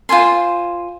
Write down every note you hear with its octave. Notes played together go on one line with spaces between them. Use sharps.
F4 C5 G#5 C6